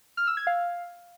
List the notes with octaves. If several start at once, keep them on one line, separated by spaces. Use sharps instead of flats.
F6
E6
G#6
F5